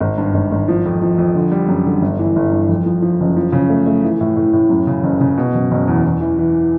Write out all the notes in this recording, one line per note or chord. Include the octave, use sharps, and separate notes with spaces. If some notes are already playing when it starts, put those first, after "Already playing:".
G#1
G2
G#1
G#1
F3
F2
F3
F2
D3
G3
F#2
D3
G1
E3
G1
G2
F2
F3
F3
F#1
F3
C#3
A3
A3
E3
A2
A2
A2
F#2
C#3
F#1
C#3
B2
F#1
F#1
E2
E2
E3
E3